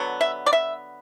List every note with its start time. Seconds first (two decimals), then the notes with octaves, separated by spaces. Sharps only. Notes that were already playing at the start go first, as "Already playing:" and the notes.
Already playing: D3 F#3 B3
0.21 E5
0.46 D5
0.53 E5